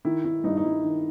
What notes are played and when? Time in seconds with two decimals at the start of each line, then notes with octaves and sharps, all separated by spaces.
0.05 D#3 E4
0.24 D#3 E4
0.44 G2 D#4
0.57 D#4
0.64 G2 E4
0.84 D#3